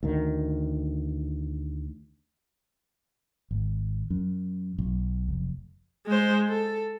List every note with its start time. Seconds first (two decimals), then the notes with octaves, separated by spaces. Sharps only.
0.03 D2 D#3
3.51 G#1
4.10 F#2
4.79 B1
5.28 F1
6.06 G#3 C5
6.48 A4